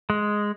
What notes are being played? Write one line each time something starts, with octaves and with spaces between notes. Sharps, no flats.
G#3